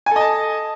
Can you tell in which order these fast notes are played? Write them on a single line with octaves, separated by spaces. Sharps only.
G#5 A4 D#5 A5